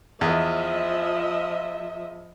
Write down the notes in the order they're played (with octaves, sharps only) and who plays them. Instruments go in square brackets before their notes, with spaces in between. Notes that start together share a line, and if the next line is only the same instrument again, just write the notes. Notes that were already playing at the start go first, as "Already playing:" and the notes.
[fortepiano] E2 [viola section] F3 D#5 E5